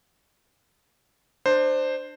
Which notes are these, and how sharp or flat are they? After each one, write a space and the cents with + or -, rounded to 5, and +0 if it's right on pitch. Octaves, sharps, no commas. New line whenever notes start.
D4 +25 C5 +0